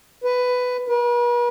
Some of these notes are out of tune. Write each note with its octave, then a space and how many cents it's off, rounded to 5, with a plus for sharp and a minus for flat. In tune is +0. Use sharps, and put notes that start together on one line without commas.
B4 +10
B4 -45